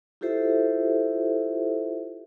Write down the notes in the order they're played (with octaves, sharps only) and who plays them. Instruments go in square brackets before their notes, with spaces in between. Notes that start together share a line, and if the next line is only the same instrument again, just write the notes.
[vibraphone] E4 F4 G4 A4 C5 E5